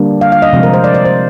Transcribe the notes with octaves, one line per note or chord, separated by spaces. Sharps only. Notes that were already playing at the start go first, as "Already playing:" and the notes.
Already playing: D3 G3 A#3 D4
F5
F5
D#5
C3 F3 G#3 C4
A#4
C5
D5
D5
C5